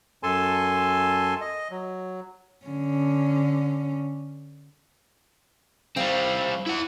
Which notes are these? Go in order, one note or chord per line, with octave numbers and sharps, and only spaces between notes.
F#2 A4 G#5 A5 C6
D#5
F#3
D3 C#4
D#2 G3 C4 C5 F5
E4 F#5